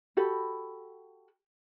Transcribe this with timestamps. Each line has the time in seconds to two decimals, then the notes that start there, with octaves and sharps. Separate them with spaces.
0.17 F#4 G4 A4 B5